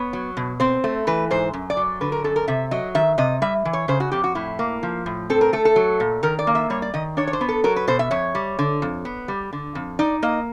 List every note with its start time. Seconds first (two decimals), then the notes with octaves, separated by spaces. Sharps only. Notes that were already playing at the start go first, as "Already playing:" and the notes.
Already playing: B3 C#5
0.13 F#3
0.37 B2
0.60 C4 C5
0.84 A3
1.07 E3 B4
1.31 G#2 C5
1.53 F#2
1.70 D5
1.77 F#3
2.01 D3 B4
2.12 A#4
2.24 F#2 A4
2.36 A#4
2.48 C3 E5
2.71 F#3 D#5
2.95 D#3 E5
3.18 C3 D#5
3.42 G3 E5
3.65 E3
3.73 C#5
3.88 C#3 C5
4.00 F#4
4.12 F2 G4
4.24 F#4
4.35 A2 E4
4.59 A#3
4.83 F3
5.06 A2
5.30 C4 A4
5.41 A#4
5.53 A3 A4
5.65 A4
5.76 F#3
6.00 A#2
6.23 D#3 A#4
6.39 D5
6.47 A#3
6.55 E5
6.70 G3 C#5
6.82 D5
6.94 D#3 D#5
7.17 D4 C#5
7.27 C#5
7.33 C5
7.41 B3
7.49 A4
7.64 F#3 A#4
7.76 B4
7.88 B2 C5
7.99 E5
8.11 F2 C#5
8.35 G3
8.59 D3
8.82 F2
9.05 B3
9.28 G3
9.53 D3
9.75 F2
9.99 D#4 D5
10.22 A#3 D#5